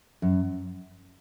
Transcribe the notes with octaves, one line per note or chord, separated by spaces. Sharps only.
F#2